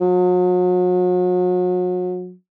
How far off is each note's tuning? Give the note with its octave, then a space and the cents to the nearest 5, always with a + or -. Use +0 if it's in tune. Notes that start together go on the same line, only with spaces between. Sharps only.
F#3 -40